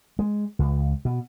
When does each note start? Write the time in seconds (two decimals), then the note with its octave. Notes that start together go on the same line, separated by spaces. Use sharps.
0.19 G#3
0.59 C#2
1.05 B2